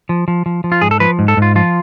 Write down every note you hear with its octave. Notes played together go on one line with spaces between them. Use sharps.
F3
F3
F3
F3
F4
G#2 G#4
A4
F3 B4
G#2
A4
G#2 F4
F3 F4